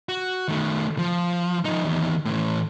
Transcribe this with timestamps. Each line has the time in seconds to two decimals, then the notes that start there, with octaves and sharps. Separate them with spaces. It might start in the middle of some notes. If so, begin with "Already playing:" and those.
0.09 F#4
0.48 D#3 A3
0.98 F3
1.65 F3 D#4
1.84 E2 D#3
2.25 A2 E3